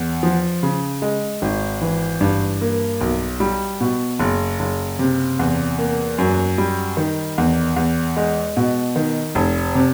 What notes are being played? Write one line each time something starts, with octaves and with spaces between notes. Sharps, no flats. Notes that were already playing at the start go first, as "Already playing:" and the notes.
Already playing: E2
F3
C#3
G#3
G#1
E3
G2
A#3
B1
G3
B2
F#1
F#1
C3
E2
A#3
F#2
G3
D#3
E2
E2
G#3
B2
D#3
F1
C3